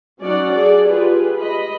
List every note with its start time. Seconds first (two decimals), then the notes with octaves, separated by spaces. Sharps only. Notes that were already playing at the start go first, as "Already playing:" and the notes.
0.21 F#3 C#4 D#4 D5 F#5
0.52 G#4 A4 D5
0.86 F4 G4 G#4 B4
1.40 D#5 B5